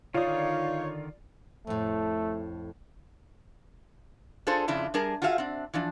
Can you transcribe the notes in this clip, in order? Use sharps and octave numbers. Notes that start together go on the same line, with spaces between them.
D3 D#3 D#4 F4 C#5 D5 F5 D#6
F2 A2 A3
D4 F4 G#4 A4 C5
F2 C#3 D4 E4 F4
G3 D4 G#4 A#4 A5
F4 F#4 G#4 E5 F5
C4 D4
E3 F3 D4